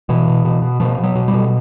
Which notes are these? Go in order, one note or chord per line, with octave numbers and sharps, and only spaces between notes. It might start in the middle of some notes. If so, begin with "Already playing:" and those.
B2 E3
B2
B2
B2
B2 F3
B2
F#3
B2
G3
B2